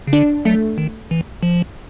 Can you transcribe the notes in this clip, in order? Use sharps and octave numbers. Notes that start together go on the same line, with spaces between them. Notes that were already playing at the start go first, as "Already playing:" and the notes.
C#3
D3 D4
F#3 A3
D#3
E3
F3